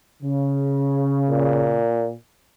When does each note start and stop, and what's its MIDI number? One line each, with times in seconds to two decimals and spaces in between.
0.23 1.81 49
1.31 2.13 46